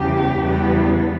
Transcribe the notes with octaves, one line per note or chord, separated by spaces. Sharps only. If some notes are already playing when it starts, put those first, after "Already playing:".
Already playing: E2 C#3 G3 G4
E2 C#3 E3 G3 B3